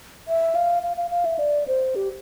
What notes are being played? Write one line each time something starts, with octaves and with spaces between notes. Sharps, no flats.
E5
F5
F5
F5
F5
E5
D5
C5
G4